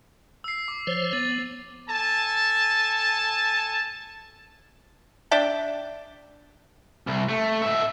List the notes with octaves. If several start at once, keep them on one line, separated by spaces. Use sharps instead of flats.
E6 C7
D6
F3 C5 C#5
B3 A6
A4 G#5 A5
D4 D5 E5 G5
C2
A3
G#2 E5